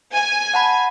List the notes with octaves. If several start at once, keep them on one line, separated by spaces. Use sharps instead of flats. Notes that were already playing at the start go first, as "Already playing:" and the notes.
G#5
F#5 A5 B5